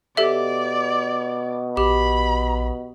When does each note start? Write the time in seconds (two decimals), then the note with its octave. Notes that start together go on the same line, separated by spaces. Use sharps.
0.17 B2 G4 A4 D5 E5
1.77 A#1 G4 B5